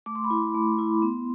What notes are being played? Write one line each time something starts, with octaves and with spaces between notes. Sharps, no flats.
A3 D6
C6
B5
E4 C6
A3
E4
B3